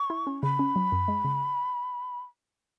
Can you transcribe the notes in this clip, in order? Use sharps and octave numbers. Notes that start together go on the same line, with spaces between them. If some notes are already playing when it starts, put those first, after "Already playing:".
Already playing: C#6
E4
C#4
C#3 B5
C#4
F#3
F#2
G#3
C#3